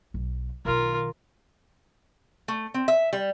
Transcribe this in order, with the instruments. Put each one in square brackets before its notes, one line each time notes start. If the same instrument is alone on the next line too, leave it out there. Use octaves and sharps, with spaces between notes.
[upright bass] B1 F#3
[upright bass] B1 D#3 [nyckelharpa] F4 A#4
[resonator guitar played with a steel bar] A3
C4
E5
G3